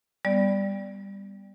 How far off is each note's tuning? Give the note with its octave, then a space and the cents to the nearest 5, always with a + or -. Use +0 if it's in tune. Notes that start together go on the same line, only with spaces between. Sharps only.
G3 +15 B3 +0 D5 +0